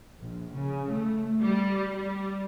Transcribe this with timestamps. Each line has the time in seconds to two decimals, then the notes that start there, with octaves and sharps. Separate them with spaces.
0.20 A#1
0.53 C#3
0.89 A3
1.41 G3
1.96 G3